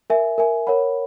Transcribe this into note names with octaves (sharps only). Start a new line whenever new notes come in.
A#4 E5 G#5
A#4 E5 G#5
A#4 C#5 F#5 B5